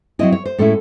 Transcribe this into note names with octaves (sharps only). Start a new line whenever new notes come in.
F#3 C4 E4 D#5
C#5
C5
A2 G#3 C#4 E4 A4